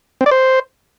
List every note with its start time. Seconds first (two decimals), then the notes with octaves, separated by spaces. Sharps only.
0.21 C4
0.26 D5
0.31 C5